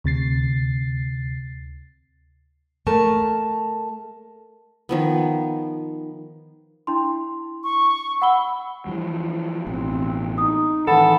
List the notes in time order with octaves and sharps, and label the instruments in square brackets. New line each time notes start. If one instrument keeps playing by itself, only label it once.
[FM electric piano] D2 C3 A6 C7
[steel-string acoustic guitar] A3 A#4 A5
[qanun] D#3 F3 B3
[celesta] D4 E4 C6
[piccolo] C#6
[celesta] F#5 B5 G7 [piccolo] E6
[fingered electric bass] E3 F3 G3
[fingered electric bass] A1 B2 [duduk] C4
[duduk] D#4 [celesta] D#6
[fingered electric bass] A2 D#3 [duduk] E3 [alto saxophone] A4 [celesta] F#5 B5